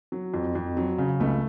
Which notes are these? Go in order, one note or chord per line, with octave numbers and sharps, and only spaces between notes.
F#3
F2
F2
F#3
C#3
C#2 A3